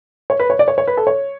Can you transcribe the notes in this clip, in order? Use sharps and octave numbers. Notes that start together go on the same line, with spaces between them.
C#5
B4
C#5
D5
C#5
C#5
B4
A4
C#5